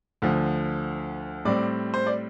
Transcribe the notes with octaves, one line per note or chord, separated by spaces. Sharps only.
D2 D3 F3
A2 G3 C4 D5
C5
D5